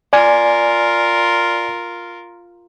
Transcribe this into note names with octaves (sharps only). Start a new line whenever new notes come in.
F4 A#4 D5 G#5